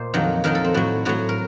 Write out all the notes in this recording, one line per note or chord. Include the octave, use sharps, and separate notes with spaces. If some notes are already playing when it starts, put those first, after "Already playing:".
Already playing: A#2 C5 D#5
F2 D#3 F#3
F2 D#3 F#3 A#4
A4
C4
A2 F#3 F#4
A2 F#3 F#4
A#4